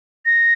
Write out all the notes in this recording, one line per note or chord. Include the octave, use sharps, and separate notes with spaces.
A#6